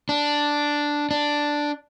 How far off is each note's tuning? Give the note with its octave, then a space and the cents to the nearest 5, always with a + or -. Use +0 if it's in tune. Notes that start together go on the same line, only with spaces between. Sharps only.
D4 +0
D4 +0